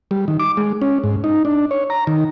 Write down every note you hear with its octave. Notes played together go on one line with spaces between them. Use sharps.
G3
D#3
D6
G#3
C#4
G#2
D#4
D4
C#5
A#5
D#3